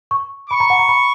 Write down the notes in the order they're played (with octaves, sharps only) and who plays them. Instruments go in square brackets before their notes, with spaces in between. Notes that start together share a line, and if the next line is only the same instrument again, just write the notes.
[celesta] C#6
[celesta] B5 [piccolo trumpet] C#6
[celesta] A#5
F#5
A#5
B5